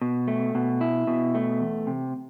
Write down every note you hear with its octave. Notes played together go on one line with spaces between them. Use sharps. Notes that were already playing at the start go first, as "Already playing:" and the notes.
B2
A3
B2
E4
B2
A3
E2
C3